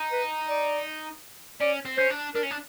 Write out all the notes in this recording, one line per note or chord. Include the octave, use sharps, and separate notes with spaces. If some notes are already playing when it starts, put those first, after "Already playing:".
Already playing: D#4
B4
D5
C#4 D5
C4
C#4 C5
D4
D4 A#4
C#4
D4